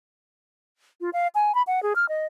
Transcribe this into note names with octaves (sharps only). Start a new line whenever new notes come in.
F4
F5
G#5
B5
F#5
G#4
F6
D#5